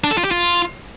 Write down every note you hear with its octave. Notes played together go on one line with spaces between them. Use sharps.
D4
A4
F4
G4
F4